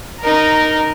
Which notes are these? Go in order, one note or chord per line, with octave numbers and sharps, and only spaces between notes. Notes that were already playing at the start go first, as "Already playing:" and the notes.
D#4 A#4